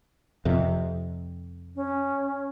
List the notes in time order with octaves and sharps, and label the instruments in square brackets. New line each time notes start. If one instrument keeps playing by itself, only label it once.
[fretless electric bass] F2 C3
[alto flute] C#4